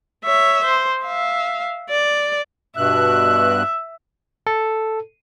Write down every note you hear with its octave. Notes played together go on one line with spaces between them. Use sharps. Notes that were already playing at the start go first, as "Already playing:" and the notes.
C#5 E5
C5
E5 F5
D5
G2 B2 E5 F#6
A4